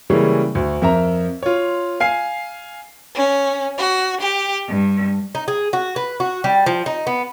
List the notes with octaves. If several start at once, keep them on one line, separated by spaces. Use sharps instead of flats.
C#3 E3 G3 G#3 A#3 C#4
D2
F2 A#4 E5 A#5
F4 C#5
F5 G#5 C7
C#4
F#4
G4
G2
D#4
G#4
F#4
B4
F#4
G3
F3
D#4
B3